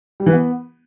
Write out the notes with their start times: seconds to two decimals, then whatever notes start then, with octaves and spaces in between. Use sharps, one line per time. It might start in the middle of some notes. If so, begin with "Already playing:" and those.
0.20 G3
0.26 E3
0.33 B3